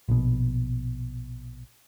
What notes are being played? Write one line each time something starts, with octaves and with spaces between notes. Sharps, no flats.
A#1 B2